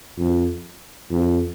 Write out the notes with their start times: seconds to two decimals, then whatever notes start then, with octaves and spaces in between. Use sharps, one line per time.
0.18 F2
1.11 F2